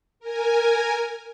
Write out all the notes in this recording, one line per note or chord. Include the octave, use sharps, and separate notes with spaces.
A#4 G#5